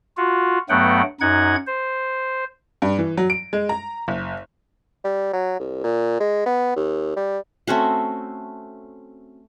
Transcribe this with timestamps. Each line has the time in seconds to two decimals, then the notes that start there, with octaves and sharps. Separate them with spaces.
0.17 F4 F#4
0.69 G2 F#3 A3 B3 F#5 G5
1.21 F#2 D#4 F#5 G#6
1.67 C5
2.82 G2
2.99 E3
3.17 F#3
3.30 D7
3.53 G#3
3.69 A#5
4.08 F#1
5.05 G3
5.33 F#3
5.59 C2
5.84 A#2
6.20 G#3
6.46 B3
6.76 D#2
7.16 G3
7.67 A3 C4 C#4 F#4